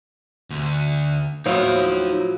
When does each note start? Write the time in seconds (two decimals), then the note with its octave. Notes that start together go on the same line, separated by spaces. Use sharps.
0.50 D2
1.46 A2 F3 F#3 D#4 F5